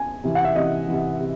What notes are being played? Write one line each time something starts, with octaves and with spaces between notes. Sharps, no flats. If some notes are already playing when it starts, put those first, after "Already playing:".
Already playing: G#5
C3 E3
F#5
E5
C3 E3 D#5
C3 E3
C3